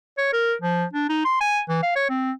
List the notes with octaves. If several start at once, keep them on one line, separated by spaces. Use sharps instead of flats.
C#5
A#4
F3
D4
D#4
C6
G#5
E3
F5
C#5
C4